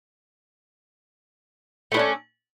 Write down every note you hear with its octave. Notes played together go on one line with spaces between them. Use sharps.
A3 C#4 D4 E4